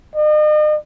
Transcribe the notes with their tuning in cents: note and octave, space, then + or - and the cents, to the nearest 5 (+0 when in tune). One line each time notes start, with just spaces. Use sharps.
D#5 -40